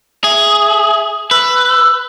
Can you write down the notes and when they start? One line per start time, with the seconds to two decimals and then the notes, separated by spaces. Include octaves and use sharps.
0.24 G#4 E5
1.31 B4 E6